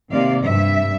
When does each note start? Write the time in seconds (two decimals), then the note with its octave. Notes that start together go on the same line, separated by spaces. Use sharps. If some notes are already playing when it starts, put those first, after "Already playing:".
0.11 C3 D#3 A#3 C4 D5 F5
0.45 G2 E5